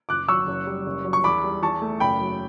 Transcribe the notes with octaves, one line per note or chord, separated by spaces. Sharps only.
F#1 D6 F#6
F#3 C#6 E6
F#1
G3
F#1
F#3
C#6
E2 B5 D6
G3
E2 A5 C#6
A3
F#1 G5 B5
F#3